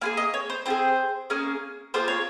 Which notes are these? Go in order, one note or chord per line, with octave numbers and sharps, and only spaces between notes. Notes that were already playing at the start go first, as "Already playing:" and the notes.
A#3 F4 G#4 G#5
D#5
C#5
C5
C4 F4 G#4 C5
A#3 C#4 G#4
A#3 F4 G#4 C5
C#5